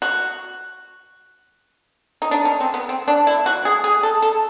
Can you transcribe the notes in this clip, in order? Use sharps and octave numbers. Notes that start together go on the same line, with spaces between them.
F#4
D#4
D4
C#4
C4
B3
C4
D4
E4
F#4
G#4
G#4
A4
A4